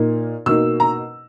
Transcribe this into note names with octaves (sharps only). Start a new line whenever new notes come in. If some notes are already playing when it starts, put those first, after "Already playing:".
Already playing: A#2 A#3 D#4
B2 A#3 D#4 E6
A#5